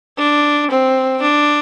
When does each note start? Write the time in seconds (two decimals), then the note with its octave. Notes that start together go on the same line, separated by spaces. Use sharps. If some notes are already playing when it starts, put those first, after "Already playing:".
0.17 D4
0.70 C4
1.21 D4